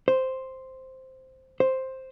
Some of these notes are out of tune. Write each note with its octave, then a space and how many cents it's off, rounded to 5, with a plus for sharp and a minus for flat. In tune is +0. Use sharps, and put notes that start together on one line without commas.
C5 +0
C5 +5